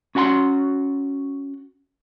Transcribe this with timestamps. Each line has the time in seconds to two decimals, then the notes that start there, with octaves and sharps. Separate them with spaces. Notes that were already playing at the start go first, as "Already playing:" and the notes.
0.15 C#4 F#4 F#5 G#5 C6